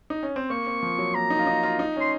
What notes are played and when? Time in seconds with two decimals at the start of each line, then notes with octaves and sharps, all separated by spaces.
0.10 D#4
0.23 C#4
0.36 C4
0.50 A#3 C#6
0.66 C4
0.83 F3
0.98 F#3
1.15 A#3 A#5
1.30 D#4
1.39 F4
1.47 D#4
1.63 F4
1.79 D#4
1.96 C#4 C6